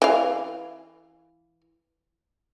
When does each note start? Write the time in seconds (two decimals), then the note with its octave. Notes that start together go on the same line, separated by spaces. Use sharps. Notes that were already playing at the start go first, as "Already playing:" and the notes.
0.02 E3 F5